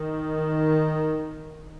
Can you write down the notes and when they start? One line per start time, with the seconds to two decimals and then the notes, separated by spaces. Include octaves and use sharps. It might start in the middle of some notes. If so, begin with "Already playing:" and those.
Already playing: D#3